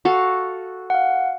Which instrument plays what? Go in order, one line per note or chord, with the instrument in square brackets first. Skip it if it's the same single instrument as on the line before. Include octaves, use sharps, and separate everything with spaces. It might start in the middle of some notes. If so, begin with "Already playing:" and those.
[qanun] F#4 A4 F5
[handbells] F5 F#5